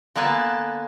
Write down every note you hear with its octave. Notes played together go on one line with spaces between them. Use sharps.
D3 A#3 B3 G#5 A5